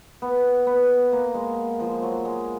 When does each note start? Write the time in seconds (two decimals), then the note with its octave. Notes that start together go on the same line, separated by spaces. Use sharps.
0.22 B3
0.67 B3
1.12 A#3
1.34 G#3
1.80 F3
2.03 F#3
2.25 G#3